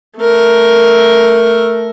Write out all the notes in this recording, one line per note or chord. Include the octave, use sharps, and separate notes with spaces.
A3 A#4